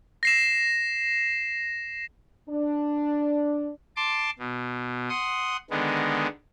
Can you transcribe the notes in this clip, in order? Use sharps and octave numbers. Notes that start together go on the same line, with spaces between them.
A#6 C7 E7
D4
A5 C6 D6
B2
F#5 C6 D#6
D3 D#3 G#3 B3